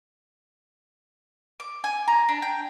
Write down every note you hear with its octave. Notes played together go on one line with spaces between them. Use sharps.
D6
G#5
A#5
D4
G5